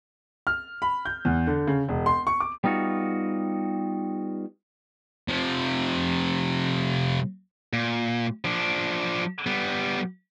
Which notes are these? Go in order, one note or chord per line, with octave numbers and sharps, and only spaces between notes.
F6
B5
G6
E2
D3
C#3
E1
C6
C#6
D6
G3 B3 D#4 F4 F#4
C3 F3
A#2
F3 D4
G3 B3